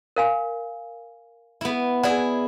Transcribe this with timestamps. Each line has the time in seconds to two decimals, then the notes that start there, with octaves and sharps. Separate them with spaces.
0.16 A#4 F5 G#5
1.61 B3 E4
2.03 E4 G#4 D5 F#5